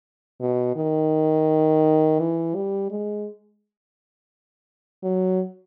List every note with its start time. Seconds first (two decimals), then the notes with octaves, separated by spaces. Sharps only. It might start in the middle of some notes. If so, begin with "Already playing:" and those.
0.41 B2
0.76 D#3
2.20 E3
2.55 G3
2.90 G#3
5.04 F#3